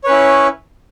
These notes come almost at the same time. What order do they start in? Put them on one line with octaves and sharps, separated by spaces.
C#5 B4 C#4 E4